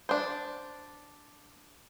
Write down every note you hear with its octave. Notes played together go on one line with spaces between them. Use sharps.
D4 C5